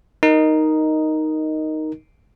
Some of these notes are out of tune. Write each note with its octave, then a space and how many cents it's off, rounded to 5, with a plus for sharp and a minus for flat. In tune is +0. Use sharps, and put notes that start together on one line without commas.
D#4 +0 A#4 +0 D#5 -5